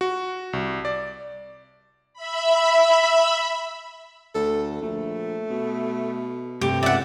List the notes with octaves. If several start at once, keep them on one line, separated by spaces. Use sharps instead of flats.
F#4
C2
D5
E5 B5
D2 A4
A#1 A3
B2
G2 C3 A3 G4
C#2 D5 E5 F#5